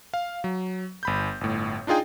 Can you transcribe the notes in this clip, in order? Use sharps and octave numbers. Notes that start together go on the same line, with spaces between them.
F5
F#3
G1 B5 G6
G1 A2
D4 D#4 F4 G#4 G5